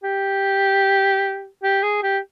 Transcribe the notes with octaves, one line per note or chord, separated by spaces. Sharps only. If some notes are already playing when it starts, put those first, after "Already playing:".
G4
G4
G#4
G4